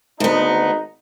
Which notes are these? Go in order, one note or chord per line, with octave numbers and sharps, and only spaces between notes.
G#1 D2 B3 D#4